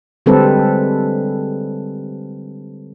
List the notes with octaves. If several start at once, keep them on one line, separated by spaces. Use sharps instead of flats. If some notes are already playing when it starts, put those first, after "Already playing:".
D3 G3 G#3 C4 A4 B4